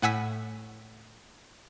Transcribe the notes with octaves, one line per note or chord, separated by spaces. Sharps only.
A2 F#5 G#5 E6 B6